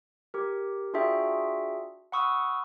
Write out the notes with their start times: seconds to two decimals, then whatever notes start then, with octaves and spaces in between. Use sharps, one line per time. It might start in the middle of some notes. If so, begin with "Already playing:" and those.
0.34 G4 A#4
0.94 D4 F4 F#4 G#4 E5 G5
2.12 F#5 B5 C#6 D#6 E6